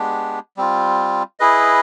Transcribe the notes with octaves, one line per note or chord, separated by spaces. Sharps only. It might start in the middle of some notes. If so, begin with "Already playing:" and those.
Already playing: G#3 B3 D4 G4
G3 C4 F4
E4 G#4 B4 D#5